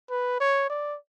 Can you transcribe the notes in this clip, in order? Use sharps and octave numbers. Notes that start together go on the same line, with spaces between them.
B4
C#5
D5